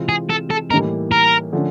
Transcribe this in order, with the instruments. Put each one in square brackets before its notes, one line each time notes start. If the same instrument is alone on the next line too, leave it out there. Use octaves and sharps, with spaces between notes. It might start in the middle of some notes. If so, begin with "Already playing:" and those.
Already playing: [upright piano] C3 E3 G#3 C4 F4
[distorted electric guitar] G#4
A4
A4
[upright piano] A2 E3 G3 A#3 D#4 [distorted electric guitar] A#4
[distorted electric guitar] A#4
[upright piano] D3 F3 A3 C#4